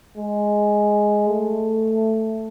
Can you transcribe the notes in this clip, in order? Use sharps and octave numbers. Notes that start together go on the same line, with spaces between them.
G#3
A3